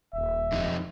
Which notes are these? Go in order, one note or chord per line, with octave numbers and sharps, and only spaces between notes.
D#1 E5
F2 D#4